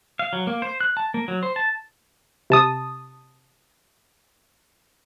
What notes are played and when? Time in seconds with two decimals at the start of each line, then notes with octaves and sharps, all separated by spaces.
0.19 F5
0.33 F#3
0.47 A#3
0.62 C5
0.81 F#6
0.97 A5
1.14 A#3
1.28 F#3
1.43 C5
1.56 A5
2.50 C3 A5 D#6